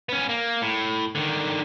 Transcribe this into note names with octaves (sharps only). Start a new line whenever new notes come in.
B3 C#4
A#3
A2
D3 D#3